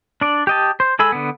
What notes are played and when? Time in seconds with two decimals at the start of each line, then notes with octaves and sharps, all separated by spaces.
0.21 D4 D5
0.47 G4 D#5 A5
0.80 C5
0.99 G#3 A4 G#5 B5 E6
1.12 D3 B3